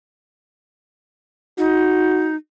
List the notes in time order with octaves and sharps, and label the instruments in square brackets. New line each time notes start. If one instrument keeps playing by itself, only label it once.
[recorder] D#4 [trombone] F#4